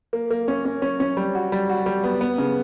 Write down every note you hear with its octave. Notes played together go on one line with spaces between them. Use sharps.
A#3
A#3
C#4
C#4
C#4
C#4
G3
F#4
G3
F#4
G3
B3
B3
C#3